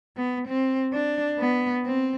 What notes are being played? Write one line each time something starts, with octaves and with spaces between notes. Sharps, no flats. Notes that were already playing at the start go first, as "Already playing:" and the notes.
B3
C4
D4
B3
C4